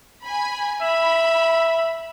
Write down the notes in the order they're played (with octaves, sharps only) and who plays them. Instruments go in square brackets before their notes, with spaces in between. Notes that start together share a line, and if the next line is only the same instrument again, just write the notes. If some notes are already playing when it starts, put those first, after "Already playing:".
[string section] G#5 B5
[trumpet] E5 [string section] B5